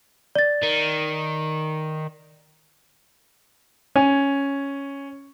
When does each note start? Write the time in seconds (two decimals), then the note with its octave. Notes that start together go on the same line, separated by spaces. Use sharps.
0.35 D5 A6
0.63 D#3
3.96 C#4 G#5